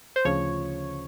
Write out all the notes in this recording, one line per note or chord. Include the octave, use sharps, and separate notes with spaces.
C5
D2 C#3 F3 C#5